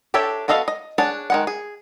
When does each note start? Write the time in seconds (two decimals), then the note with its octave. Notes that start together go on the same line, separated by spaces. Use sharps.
0.14 D4 G4 A4 C#5 E5
0.48 B3 F#4 A4 D#5 F5
0.68 D#5
0.98 D4 G#4 C#5 F#5 A5
1.30 D#3 G#3 F#5
1.47 G#4